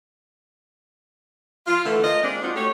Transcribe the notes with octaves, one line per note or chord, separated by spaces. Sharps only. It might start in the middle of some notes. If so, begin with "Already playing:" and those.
F4
D3 E3 A3
F4 A#4 D#5
G#3 A#3 C4 D4
C4 D4 D#4 F4 F#4
A3 F#4 G4 C#5